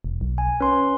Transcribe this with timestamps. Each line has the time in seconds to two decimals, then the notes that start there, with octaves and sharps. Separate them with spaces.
0.04 E1
0.21 B1
0.38 G#5
0.60 C#4 B4 C6